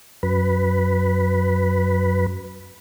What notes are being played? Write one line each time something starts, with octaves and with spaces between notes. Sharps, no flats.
F#2 B4